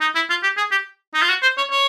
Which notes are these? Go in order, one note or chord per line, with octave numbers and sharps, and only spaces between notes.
D#4
E4
F4
G4
G#4
G4
D#4
F4
F#4
C5
C#5
C#5